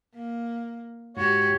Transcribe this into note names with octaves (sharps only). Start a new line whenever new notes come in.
A#3
G#2 F#4 G4 C#5